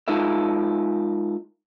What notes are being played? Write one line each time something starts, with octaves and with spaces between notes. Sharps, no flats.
G#3 D#4 F4 A#4 E5